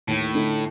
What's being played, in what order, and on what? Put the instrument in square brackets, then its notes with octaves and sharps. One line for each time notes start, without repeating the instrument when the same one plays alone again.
[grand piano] D#2 [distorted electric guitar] A2
[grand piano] D3 A3 D#4